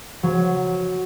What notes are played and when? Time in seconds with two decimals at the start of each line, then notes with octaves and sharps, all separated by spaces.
0.23 F#3